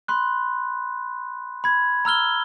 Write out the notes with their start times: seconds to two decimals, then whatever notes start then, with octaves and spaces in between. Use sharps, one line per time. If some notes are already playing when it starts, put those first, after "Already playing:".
0.08 B5 C6 F#6
1.64 B5 G#6
2.05 A#5 E6 F6 G7